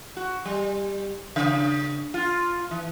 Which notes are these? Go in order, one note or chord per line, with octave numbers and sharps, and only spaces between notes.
F#4
G3
C#3
F4
E3